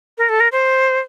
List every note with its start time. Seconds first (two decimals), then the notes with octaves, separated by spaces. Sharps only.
0.18 A#4
0.29 A4
0.40 A#4
0.52 C5